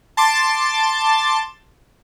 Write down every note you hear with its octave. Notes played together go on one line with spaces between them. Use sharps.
A5 C6 D6 A6